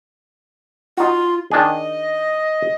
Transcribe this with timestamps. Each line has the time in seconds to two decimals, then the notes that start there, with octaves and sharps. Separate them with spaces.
0.97 D#4 F4 F#4
1.52 D#3 D4 G#4 D#5